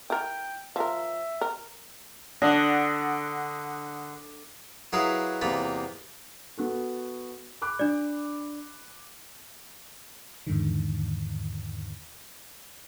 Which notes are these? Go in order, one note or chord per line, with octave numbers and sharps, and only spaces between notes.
E4 A#4 G5
F3 A#4 E5
A#4
D3 D4 F#5 D#6 A#6
F#3 E4 G#4 A#4 B4 F5
E2 C3 A#3 F4 B5
B3 F#4 A4
B5 D6 F#6
D4 D5
E2 G#2 D3 D#3